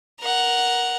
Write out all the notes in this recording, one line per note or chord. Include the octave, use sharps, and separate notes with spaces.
A#4 F#5